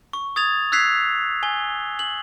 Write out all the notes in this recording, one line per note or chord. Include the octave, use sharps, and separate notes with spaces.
C#6
D#6 G#6 A6 F7
E6 F#6 G#6 B6 C7 F7
G#5 G7
F#7